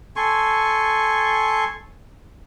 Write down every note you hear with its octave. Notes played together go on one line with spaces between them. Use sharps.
A4 G#5 C6 C#6